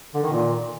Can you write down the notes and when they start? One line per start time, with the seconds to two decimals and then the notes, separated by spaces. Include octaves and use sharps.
0.14 D3
0.23 D#3
0.32 A#2